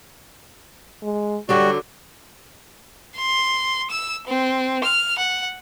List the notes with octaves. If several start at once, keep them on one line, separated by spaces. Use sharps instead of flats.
G#3
D3 F#3 G3 D4 F#4
C6
E6
C4
F6
F#5